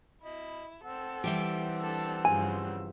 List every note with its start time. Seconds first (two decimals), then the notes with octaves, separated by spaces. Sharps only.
0.24 E4 D#5 B5
0.84 C4 A4 F#5 E6
1.24 E3 G3 G4
1.82 D4 A4
2.25 G2 C#3 F3 G#5